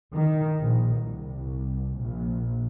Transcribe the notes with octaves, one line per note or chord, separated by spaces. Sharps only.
D#3
A#1
C2
A#1